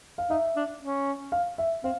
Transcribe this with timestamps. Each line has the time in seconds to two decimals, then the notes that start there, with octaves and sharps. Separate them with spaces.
0.18 F5
0.30 D#4 E5
0.56 D4
0.81 C#4
1.32 F5
1.58 E5
1.84 C4 F5